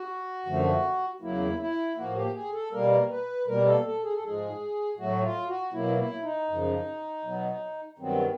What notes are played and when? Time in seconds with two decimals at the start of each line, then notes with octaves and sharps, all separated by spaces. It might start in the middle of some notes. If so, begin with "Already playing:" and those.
Already playing: F#4
0.46 F#2 D3 F3 A3
1.21 E2 C#3 F#3 A#3 E4
1.59 E4
1.96 A2 F3 A#3 F#4
2.15 G4
2.34 G#4
2.52 A4
2.71 B2 G3 A#3 A#4
3.09 B4
3.47 B2 G3 A#3 A#4
3.66 A4
3.85 A4
4.03 G#4
4.14 A4
4.22 G#2 F3 G#3 G#4
4.97 A2 F#3 A3 F#4
5.22 F4
5.48 F#4
5.72 B2 F#3 A#3 E4
5.98 E4
6.23 D#4
6.48 F#2 C#3 F3
7.23 B2 F#3 B3
7.98 G2 D#3 F#3 B3 C4